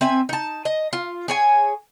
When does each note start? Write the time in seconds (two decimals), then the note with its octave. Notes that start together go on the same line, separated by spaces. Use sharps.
0.01 C4 E5 G#5
0.29 D#4 A5
0.65 D#5
0.93 F4
1.28 G#4 C#5 G#5